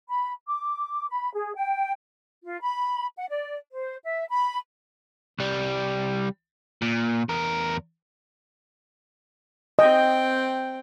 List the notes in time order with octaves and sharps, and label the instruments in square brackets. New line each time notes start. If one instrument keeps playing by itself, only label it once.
[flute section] B5
D6
B5
G#4
G5
F4
B5
F#5
D5
C5
E5
B5
[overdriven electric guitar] C2 G3
A#2
E2 A#4
[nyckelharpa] C4 G5 [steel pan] D#5